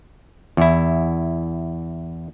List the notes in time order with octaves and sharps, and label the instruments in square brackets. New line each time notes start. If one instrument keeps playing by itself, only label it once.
[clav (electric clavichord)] E2 E4